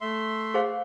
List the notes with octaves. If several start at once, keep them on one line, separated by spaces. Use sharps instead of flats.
A3 E5 C6
G#4 C5 F5